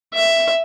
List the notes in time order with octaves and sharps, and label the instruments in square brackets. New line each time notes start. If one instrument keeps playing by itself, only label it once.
[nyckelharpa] E5